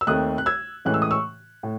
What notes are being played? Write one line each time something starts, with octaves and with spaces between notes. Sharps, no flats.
E6
D#2 D#3 A3 C4 D#6 F#6
F#6
E6 G#6
A2 E3 G#3 C#4 F#6
E6
D#6
C#6 E6
A2